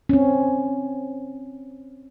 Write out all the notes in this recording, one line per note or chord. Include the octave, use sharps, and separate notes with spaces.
C4 C#4